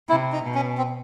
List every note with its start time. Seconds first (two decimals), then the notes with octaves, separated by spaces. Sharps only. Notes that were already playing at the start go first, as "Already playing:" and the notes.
0.08 C3 E4
0.32 D#4
0.43 B2
0.54 C#4
0.78 C4